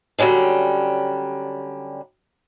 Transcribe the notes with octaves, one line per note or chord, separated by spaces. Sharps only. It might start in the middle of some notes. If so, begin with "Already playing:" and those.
D3 F#3 G3 C#4 D4